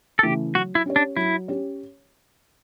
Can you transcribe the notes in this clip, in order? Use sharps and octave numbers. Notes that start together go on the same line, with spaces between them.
A4
C#3 E3 A3 G4
F#3 F#4
E4
C#4 G4 C#5
D4
F#3 E4
C#4 G4 C#5